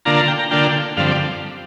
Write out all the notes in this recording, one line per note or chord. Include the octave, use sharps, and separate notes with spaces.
D3 A#3 D4 F4 A#5
A#5
G5
A#5
D3 A#3 D4 F4 G5
G2 D3 F3 C4 F5
D5